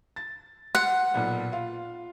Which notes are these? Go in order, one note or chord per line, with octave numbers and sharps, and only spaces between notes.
A6
F#5 C6
B1 A#2 B3
F4 F5